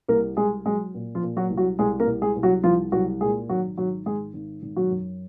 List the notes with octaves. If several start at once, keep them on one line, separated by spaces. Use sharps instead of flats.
C2 A#3 A#4
C2 G#3 G#4
F#3 G#3 G#4
A#2
F3 F4
A#2
F#3 F#4
C2
F#3 F#4
C2 G#3 G#4
A#3 A#4
C2
G#3 G#4
C2
F#3 F#4
C2 F3 F4
C2 F#3 F#4
A#2 G#3 G#4
G#1 F#3 F#4
G#1 F#3 F#4
G#1 G#3 G#4
G#1
G#1
F#3 F#4
F#2